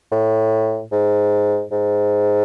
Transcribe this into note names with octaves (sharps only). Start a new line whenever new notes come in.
A2
G#2
G#2